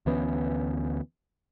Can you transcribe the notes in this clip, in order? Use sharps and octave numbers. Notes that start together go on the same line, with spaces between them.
D2 E3 B3 C#4